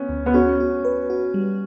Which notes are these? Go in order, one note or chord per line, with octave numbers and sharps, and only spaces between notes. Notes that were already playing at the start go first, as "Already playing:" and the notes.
Already playing: B3 C#4
D2
B3
C#4 F#4
F#4
B4
F#4
G3